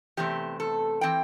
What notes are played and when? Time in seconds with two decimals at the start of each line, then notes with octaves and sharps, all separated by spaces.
0.17 E2 C3 A3 C4 G4
0.60 A4
1.01 E3 C4 G5